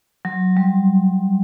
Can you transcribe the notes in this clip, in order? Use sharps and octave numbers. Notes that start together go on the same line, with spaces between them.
F#3
G3